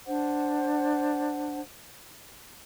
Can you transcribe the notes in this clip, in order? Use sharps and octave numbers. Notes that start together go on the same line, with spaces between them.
D4 C5 F#5